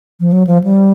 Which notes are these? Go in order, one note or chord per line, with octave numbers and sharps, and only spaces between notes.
F3
F#3
F3
G3